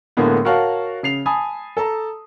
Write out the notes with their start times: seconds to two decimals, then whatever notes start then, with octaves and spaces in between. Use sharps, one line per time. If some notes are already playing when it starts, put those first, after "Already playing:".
0.17 A2 D3 G#3 A#3 B3
0.45 F#4 A#4 C#5 F5 F#5 A5
1.03 C#3 C7 F7
1.26 G#5 A5 B5 D#6
1.77 A4 A5 A#5